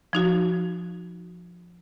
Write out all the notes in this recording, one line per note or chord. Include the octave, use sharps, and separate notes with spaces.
F3 D#4 F#4